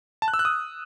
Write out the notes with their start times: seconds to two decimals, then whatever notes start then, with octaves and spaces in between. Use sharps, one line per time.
0.22 A5
0.28 F#6
0.34 E6
0.39 F#6
0.45 D#6